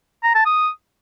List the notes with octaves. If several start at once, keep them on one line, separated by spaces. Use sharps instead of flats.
A#5
A5
D#6